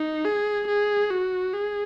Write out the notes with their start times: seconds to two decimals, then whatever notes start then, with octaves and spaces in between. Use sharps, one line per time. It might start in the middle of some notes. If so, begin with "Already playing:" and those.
Already playing: D#4
0.25 G#4
0.68 G#4
1.11 F#4
1.54 G#4